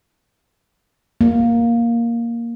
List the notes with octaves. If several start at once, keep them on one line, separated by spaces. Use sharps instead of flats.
A#3